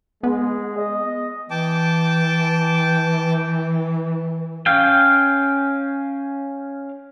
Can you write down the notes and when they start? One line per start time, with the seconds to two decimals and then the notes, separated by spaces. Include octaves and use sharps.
0.23 G#3 B3
0.77 D#5
1.50 E3 G5 A5 D6
4.66 C#4 F5 G5